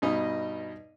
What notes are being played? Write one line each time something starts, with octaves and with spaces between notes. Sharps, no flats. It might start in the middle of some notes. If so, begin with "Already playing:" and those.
G2 B2 D#4 D#5